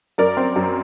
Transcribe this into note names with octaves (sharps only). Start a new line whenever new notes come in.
F#2 A#4 D5
C4
F#2